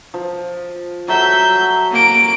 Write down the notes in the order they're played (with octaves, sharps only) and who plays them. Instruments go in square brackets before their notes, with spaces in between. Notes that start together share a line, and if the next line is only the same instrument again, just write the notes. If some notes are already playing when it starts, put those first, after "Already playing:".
[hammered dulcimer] F3
[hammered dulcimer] F#3 A4 A#5 [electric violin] E5 G6
[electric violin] A#3 D7